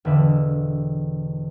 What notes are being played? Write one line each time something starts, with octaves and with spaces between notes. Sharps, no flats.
E1 D3 B4 E5 D6